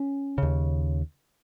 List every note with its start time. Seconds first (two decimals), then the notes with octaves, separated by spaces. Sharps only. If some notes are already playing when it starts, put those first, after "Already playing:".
Already playing: C#4
0.38 D#2 C#3